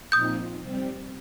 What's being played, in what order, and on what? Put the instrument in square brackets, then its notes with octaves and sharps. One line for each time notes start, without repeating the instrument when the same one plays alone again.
[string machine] A#2 F3 C4 D#4 [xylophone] D#6 G6
[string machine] C3 G3 C4